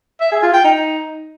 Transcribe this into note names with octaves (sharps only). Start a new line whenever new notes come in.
E5
G#4
F4
G5
D#4